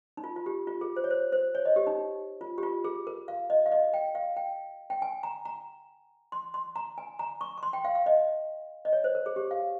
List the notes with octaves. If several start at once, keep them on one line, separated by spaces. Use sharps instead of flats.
D#4
F4
F4
G4
F4
G#4
C5
C#5
C5
C5
C#5
D#5
G4
D#4
F4
G4
F4
G#4
A#4
F5
D#5
F5
D#5
G5
F5
G5
G5
G#5
A#5
A#5
C6
C6
A#5
G#5
A#5
C#6
C#6
C6
G5
F5
F5
D#5
D#5
C#5
C5
A#4
G#4
G4
F5